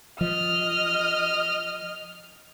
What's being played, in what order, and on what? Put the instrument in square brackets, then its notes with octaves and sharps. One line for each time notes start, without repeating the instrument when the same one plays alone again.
[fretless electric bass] F3 [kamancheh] D#5 F6